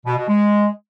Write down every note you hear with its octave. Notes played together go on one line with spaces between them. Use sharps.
B2
B2
G#3